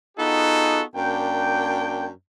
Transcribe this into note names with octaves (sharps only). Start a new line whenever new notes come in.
B3 D#4 F4 F#4 G#4 A4
F#2 A#3 D4 G5